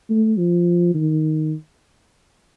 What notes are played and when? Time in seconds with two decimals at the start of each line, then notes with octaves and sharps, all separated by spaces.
0.10 A3
0.37 F3
0.94 D#3